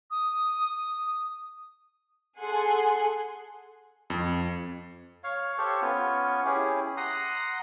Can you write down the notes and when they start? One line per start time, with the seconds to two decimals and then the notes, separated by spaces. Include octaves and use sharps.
0.11 D#6
2.39 G#4 A4 F#5 G#5 C6
4.10 F2
5.24 C#5 F5
5.58 G4 A4 C5 C#5
5.82 B3 C#4 F4 C#5
6.45 C#4 E4 G4 G#4
6.97 F#5 A#5 C6 D#6